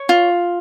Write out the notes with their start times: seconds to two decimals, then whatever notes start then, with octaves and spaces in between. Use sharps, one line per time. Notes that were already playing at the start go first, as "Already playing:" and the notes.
Already playing: C#5
0.09 F4